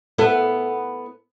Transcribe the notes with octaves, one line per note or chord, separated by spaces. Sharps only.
B3 E4 A4